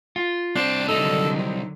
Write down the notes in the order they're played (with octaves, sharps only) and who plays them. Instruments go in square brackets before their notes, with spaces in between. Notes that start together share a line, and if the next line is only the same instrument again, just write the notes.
[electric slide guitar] F4
[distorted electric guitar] C2 A5 [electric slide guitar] C4 [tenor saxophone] D4
[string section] D3 D#3 F#3 [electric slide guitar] D#4 [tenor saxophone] A4
[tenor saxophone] C4